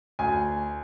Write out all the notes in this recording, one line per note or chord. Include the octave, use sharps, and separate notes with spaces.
D2 G#5